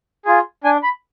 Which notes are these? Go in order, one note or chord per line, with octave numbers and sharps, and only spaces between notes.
F4 G#4
D4 G#5
B5